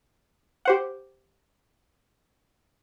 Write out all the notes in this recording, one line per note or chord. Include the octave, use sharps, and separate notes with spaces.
G4 C5 F#5